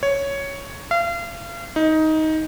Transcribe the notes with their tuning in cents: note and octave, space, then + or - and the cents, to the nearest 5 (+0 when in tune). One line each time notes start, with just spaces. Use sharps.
C#5 +5
F5 -35
D#4 +15